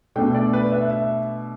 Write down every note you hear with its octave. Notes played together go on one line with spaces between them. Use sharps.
B2 A3 D4 G5
D5
B4
E5
E5